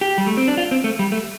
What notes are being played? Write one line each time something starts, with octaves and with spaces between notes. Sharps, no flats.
G4
G3
A3
C4
D4
F4
C4
A3
G3
A3